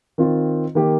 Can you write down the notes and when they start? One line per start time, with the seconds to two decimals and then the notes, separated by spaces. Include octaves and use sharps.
0.18 D#3 C4 F4
0.75 D#3 A#3 G4